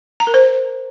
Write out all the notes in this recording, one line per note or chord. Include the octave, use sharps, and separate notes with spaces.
A#5
A#4
C5